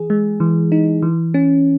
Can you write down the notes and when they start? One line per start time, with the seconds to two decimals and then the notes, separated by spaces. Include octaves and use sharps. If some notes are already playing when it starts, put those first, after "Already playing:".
Already playing: E3 G#4
0.10 G#3
0.40 E3
0.72 D#4
1.03 E3
1.34 C#4